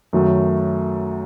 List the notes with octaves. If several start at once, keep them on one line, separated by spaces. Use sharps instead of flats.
F#2 D#3 F#3 A3